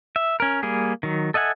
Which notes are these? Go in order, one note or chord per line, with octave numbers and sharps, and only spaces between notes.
E5
C#4 A#4
G3 A#3 G#4
D#3 F#3
A4 D#5 E5 F#5 G#5